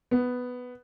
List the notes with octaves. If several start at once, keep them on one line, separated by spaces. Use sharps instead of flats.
B3